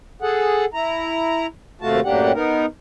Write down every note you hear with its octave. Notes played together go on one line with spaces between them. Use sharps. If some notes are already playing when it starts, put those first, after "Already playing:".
G#4 A4 F#5
E4 A#5
D#2 C3 A3 F4 F#4 A5
F#2 A2 A#3 D4 G4 F#5
B3 D#4 A#4